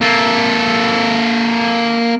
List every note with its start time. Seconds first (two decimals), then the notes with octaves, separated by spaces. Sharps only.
0.01 A#3 A4